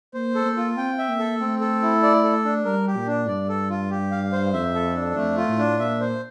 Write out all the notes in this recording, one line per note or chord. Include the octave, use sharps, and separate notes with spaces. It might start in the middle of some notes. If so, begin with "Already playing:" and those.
A#3 C5
A4
A#3
F4
C4 G5
E5
A#3
A4
A3 C4
A4
E4
D5
A4
D4
G3 A#4
G4
A#2
D4
G2 D5
A4
F4
G4
F5
C5
F2 E5
A4
D4
F2 A3
F4
A2
D4
A#2 E5
C5